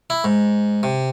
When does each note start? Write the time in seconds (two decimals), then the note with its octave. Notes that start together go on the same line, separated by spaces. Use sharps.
0.10 E4
0.24 G#2
0.83 C3